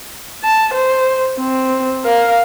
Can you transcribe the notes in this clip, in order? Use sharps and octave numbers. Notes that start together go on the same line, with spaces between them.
A5
C5
C4
A#4 F5